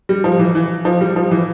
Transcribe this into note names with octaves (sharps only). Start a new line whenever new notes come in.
G3
F3
E3
E3
F3
G3
F3
E3